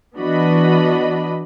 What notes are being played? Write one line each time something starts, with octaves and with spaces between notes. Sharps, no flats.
E3 B3 D4 F#4 D#5 B5